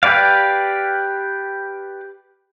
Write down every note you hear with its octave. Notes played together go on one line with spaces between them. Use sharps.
G4 B4 D5 F5